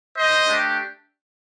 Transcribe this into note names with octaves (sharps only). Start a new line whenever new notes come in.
C5 D#5
A3 D4 G4